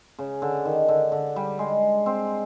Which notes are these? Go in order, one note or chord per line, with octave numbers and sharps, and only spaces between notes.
C#3
D3
D#3
D3
D3
G3
G#3
C4